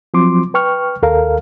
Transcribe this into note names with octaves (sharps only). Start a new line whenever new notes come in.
F3 F#3 C4 C6 D6
B4 G5 C#6 F6
D#2 A4 A#4 F5